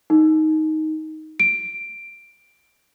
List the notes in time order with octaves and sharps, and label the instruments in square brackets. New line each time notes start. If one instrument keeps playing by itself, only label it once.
[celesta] D#4
D7